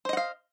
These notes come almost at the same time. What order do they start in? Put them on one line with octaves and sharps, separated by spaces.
C5 D#5 F#5 F5